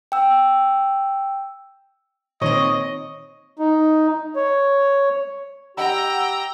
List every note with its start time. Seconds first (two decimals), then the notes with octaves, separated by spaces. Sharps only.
0.12 G5 E6
2.41 A#2 D#3 C4 C#5 D#5
3.59 D#4
4.36 C#5
5.77 G4 D#5 F#5 G5 A#5 B5 E6